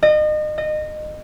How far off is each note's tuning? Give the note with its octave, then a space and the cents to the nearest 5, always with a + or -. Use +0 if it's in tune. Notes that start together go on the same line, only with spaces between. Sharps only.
D#5 -35
D#5 -25